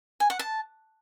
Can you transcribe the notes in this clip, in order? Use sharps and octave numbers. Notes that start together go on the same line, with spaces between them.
G#5
F#5
A5